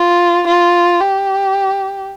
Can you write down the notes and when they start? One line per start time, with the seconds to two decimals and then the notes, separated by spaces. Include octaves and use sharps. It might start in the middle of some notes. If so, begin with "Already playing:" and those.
Already playing: F4
0.47 F4
1.00 G4